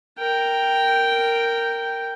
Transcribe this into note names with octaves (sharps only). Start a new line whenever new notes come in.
A#4 G5